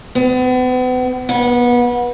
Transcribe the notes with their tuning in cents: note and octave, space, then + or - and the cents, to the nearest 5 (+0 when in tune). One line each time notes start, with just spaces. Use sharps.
B3 +40
B3 -25